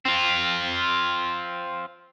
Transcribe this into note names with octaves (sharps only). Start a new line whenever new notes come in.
C4 F4